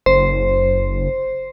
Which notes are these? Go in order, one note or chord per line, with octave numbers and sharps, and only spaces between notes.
F#1 C5